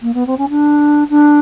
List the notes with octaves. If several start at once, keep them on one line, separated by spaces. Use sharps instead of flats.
A#3
B3
C4
C#4
D4
D4